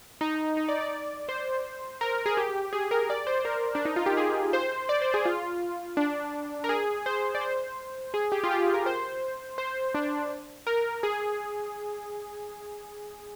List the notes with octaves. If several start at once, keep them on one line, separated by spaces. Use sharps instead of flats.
D#4
D#4
D5
D5
C5
A#4
G#4
G4
G#4
A#4
D5
C5
C5
A#4
D4
D#4
F4
G4
G#4
C5
D5
C5
G#4
F4
D4
A#4
G#4
C5
D5
C5
G#4
G4
F4
G4
G#4
A#4
C5
C5
D4
A#4
G#4